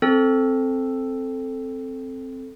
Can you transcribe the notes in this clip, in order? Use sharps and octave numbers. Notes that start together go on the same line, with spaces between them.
C4 A4